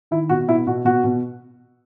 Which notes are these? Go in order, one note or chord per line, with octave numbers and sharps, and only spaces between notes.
D#3 E4
B2 F#4
B2 E4
B2 F#4
B2 F#4
B2